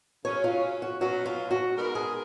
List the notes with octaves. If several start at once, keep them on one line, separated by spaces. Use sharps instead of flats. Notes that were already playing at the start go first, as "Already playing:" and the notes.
C#3 F#3 C#4 C#5
F4
F#4
B2 F#3 C#4 F#4
F4
F#4
G#3 B3 D#4 A#4
G#4